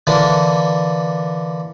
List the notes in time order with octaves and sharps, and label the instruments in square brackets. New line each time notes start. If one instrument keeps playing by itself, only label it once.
[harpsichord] D3 E3 A#3 D4